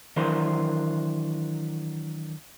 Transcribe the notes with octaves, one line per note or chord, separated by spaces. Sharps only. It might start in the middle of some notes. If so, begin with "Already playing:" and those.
D#3 E3 F#3 D4 A#4 C5